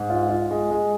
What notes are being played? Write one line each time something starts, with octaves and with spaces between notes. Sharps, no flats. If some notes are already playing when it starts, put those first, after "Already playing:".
Already playing: G#2
F4
F4
G#3
G#3